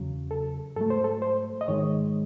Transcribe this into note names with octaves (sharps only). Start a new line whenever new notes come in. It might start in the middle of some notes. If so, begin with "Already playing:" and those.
Already playing: E2 C#3 F#3
A4
G#2 F#3 A3 A4
C5
A4
C5
D#5
G#2 D#3 G#3 C#5